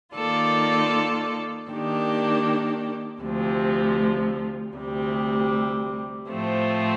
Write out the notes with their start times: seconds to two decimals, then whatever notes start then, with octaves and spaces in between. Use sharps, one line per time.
0.15 D#3 A#3 F4 A4 D5
1.69 D#3 A#3 D4 G4
3.22 D2 C3 F3
4.75 D2 C3 G3
6.29 A2 F3 A3 C4